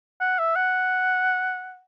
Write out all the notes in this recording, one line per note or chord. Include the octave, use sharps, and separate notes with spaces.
F#5
E5
F#5